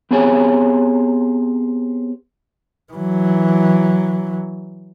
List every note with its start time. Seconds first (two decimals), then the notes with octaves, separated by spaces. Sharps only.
0.11 B3 C4 G4 G#4 C#5 G#5
2.93 E3 F#3